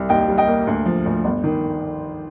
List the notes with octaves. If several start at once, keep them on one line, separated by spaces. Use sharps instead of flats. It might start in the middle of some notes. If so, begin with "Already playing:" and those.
Already playing: C2
D#2 D#5 G5
G3
D#5 G5
A#3
D2
F3
D2
G1
D#3